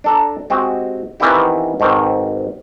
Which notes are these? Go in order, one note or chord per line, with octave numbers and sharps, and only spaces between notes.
D4 A4 A#5
G#3 C4 F#4 G4
D#3 E3 B3 C4 E4 G4
G#2 B2 D#3 C4